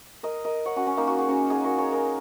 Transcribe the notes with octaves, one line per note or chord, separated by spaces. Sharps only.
A#4 D#5
A#4 D#5
C#5 F#5
C#4 F#4
C#4
A#3 D#4
F#4
G#4
C#4 F#4
D#4 G#4
F#4 A#4
G#4 C#5
A#4 D#5